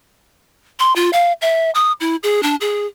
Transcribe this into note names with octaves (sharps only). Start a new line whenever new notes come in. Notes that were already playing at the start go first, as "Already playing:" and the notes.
C6
F4
F5
E5
D#6
E4
G#4
D4
G#4